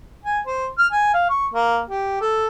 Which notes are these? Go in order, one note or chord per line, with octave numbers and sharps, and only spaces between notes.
G#5
C5
F6
G#5
F5
C#6
A#3
G4
A4